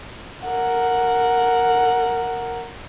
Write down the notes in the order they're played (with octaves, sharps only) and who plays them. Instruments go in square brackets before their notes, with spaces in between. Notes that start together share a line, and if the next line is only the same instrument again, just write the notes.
[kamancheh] A#4 F#5